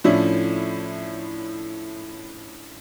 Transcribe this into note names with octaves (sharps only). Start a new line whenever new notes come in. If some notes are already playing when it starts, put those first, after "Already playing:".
A2 F3 C#4 D4 E4